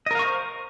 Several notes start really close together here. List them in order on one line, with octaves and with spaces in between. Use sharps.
D#5 A#4 F5 C#6 C5